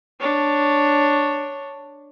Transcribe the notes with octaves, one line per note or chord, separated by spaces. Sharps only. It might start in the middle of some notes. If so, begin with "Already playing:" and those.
D4 C#5